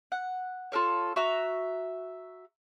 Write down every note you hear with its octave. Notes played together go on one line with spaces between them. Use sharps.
F#5
F4 A4 A#4 C#5
F#4 E5 A#5